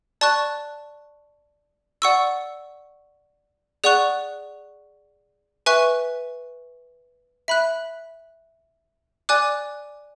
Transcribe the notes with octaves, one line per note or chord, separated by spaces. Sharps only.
D5 A5 C#6 F#6
D5 F#5 C#6 E6
G#4 D5 F#5 C#6 F#6
B4 E5 G#5 C#6 F#6
E5 B5 F#6
D5 G#5 D6 F#6